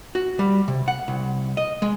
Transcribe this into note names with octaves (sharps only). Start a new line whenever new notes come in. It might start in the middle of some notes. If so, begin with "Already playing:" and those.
F#4
G3
C3
F#5
C2
D#5
G#3